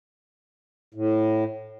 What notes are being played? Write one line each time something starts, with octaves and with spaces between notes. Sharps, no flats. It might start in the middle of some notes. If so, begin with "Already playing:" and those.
A2